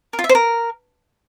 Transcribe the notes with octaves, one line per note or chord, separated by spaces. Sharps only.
A#4
F4
E5
C5
A#4